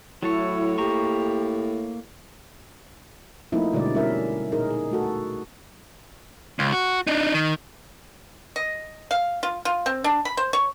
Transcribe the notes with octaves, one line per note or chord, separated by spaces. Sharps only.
A2 F#3 E4 A4 C#5
A#3 G4 A#5 C#6
F3 A3 A#3 C4 D#4 E4
B2 D3 G3 G#3 D5
G3 C#4 E4 A#4 E5
A#2 D#4 G#4 A#4
D#4 G#4
A3 F#4 A4
C#2
F#4
D4 D#4
D#3
D#5
F5
F4
F4
C4
D4
B5
C5
C#5